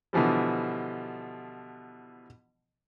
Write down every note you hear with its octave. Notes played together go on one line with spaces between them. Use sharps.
B2 D3 E3 F3 G3